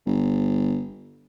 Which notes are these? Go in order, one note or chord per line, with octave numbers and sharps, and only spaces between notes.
G1